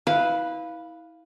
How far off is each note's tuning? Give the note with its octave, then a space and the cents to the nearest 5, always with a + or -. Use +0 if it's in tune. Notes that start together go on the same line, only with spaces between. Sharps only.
E4 -30 B4 +0 F5 +0